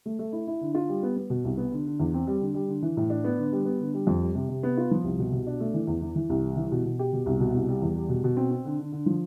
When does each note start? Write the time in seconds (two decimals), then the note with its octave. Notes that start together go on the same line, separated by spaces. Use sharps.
0.06 A3
0.19 A3
0.32 E4
0.47 E4
0.61 D3
0.74 F4
0.89 G3
1.03 B3
1.16 B3
1.30 B2
1.44 C2
1.57 B3
1.72 D3
1.86 D3
2.00 E2
2.14 C4
2.27 G3
2.40 D3
2.54 G3
2.68 D3
2.82 E3
2.97 A2
3.10 D4
3.24 B3
3.38 D3
3.52 G3
3.65 B3
3.80 D3
3.94 G3
4.07 F2
4.22 G3
4.35 C3
4.49 C3
4.63 B3
4.77 F4
4.91 F3
5.04 C2
5.19 B2
5.32 B2
5.47 D4
5.60 A3
5.74 E3
5.87 E2
6.02 E3
6.16 E3
6.29 C2
6.43 G3
6.57 E3
6.72 B2
6.85 B2
6.99 G4
7.13 B2
7.26 C2
7.40 B2
7.54 C2
7.69 G3
7.82 E2
7.96 G3
8.09 B2
8.24 B2
8.37 C4
8.51 C4
8.65 D3
8.79 D3
8.92 D3
9.06 F3